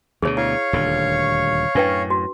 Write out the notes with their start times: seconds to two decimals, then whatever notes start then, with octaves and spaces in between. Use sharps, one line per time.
0.22 D2 B2 G#4 C#5
0.37 E4 C#5 F5 C#6
0.73 D#1 D2 D3
1.75 F#2 A2 D4 B4 G5
2.10 F#4